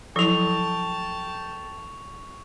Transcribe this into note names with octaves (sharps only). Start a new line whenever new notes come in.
F3 F#3 E4 A4 G5 A5 C#6 F7